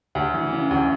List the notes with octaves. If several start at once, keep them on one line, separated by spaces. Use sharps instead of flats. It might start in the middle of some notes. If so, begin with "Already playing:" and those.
D2
E3
C#3
D2